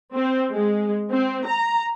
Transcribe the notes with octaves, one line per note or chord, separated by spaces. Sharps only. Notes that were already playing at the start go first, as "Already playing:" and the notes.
C4
G#3
C4
A#5